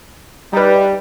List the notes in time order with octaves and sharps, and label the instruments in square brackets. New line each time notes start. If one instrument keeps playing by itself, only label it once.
[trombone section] G3 [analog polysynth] D#4 B4